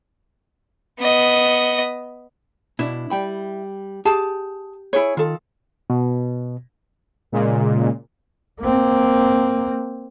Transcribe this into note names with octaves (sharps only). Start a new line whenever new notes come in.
B3 D#5
B2 D4 E4
G3 G5 B5
G4 G#4 A5
E4 G#4 C#5
D#3 F4 A4
B2
A#2 C#3 G#3
A#3 C4